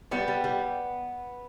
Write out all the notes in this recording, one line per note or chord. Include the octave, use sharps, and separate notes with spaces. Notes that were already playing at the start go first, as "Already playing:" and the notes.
G3 B3
G3
G3